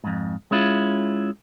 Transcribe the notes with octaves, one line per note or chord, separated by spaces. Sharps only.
F2 G#2
G#3 C#4 E4 F4